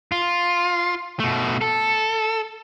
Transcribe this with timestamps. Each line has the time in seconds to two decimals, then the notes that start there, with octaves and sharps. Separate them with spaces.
0.12 F4
1.20 B2 A3
1.61 A4